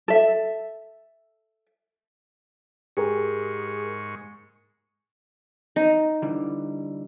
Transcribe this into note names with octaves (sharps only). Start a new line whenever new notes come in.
A4 E5
G#2 G4 G#4 A#4 C#6
D#4
D3 E3 G3